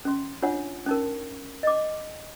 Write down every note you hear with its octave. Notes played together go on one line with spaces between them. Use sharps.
C#4 C6
D4 F4 C#5 F#5
C#4 D#4 A#4
D#5 D6